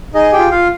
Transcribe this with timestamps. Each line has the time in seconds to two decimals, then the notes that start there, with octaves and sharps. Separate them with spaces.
0.14 D#4 G#4 D#5
0.33 G4 G5
0.38 F4
0.51 F4 F5